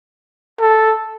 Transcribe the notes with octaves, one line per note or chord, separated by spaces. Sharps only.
A4